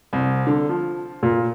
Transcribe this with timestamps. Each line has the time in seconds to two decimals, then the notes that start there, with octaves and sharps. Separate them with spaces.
0.13 C2
0.47 D3
0.69 F3
1.23 A#2